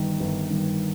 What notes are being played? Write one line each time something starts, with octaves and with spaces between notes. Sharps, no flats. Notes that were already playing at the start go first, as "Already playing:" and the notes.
Already playing: G1 G2 D#3
G1
G2 D#3